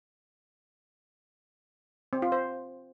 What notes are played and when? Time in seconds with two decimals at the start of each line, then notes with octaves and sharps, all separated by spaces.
2.13 C4
2.22 F4
2.32 C5